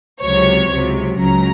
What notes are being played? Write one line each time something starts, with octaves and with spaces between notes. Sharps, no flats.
C#2 C3 F#3 C#5
C#2 C3 F#3
C#2 C#3 F#3 A#5